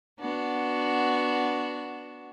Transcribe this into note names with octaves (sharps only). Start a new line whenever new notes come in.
B3 D4 F#4